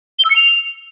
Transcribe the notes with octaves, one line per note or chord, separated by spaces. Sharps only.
G7
E6
C#7
F7